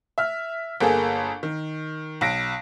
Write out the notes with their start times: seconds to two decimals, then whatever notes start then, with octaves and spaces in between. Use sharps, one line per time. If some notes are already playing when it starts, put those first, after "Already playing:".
0.18 E5 F6
0.81 G1 A#3 G#4 A4
1.43 D#3
2.21 B1 A#6 D7